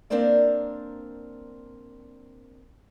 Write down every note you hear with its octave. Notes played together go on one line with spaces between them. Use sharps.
A#3 C4 D4 A#4 C5 D5